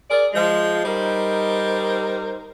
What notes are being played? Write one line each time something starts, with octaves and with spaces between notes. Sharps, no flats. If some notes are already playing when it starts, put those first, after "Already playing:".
G#4 A#4 D5
F3 G#3
G3 D#4 A#4 C5